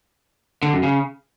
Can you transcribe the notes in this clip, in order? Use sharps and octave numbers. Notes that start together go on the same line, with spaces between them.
D3
F#2
C#3